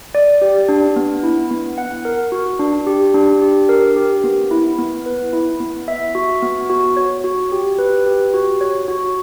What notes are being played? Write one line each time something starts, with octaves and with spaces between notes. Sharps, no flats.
D5
G4
D4
B3
E4
B3
F#5
A#4
F#4
D4
G4
D4
G4
A#4
G4
B3
E4
B3
B4
E4
B3
E5
F#4
B3
F#4
C#5
F#4
G4
B4
G4
F#4
C#5
F#4